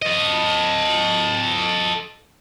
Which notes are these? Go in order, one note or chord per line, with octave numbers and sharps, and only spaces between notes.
A4 D#5